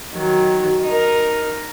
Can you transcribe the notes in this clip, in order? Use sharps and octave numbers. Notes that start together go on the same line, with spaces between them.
D#3 F#3
D#4 A#4